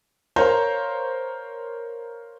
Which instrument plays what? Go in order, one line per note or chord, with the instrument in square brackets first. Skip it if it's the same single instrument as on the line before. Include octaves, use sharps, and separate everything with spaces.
[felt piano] A#4 C5 C#5 F5 A#5 C6